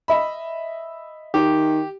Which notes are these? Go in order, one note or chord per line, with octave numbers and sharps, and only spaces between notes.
D#5 E5 B5
D#3 G4